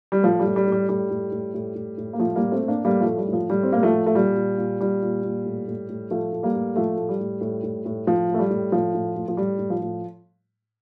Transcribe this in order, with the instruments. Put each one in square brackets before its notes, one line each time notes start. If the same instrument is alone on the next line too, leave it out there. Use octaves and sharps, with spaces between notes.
[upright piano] G3
A2 F3
G3
A2
G3
A2
G3
A2 G3
A2
A2
A2
A2
A2
A#3
A2 F3 A3
G3 A#3
A2
A3 C4
A2
A#3 D4
A2 G3 A#3
F3 A3
A2
G3
A2 F3
A2 G3
C4
A2 A#3
F3 A3
A2
A3
A#2 G3
A#2
A#2
A#2 G3
A#2
A#2
A2
A2
A2
A2 F3 A3
A2
G3 A#3
A2
A2 F3 A3
A2
G3
A2
A2
A2
A2
A2 F3
A2
A3
G3
A2
A2 F3
A2
A2
F3
A2 G3
A2
F3
A2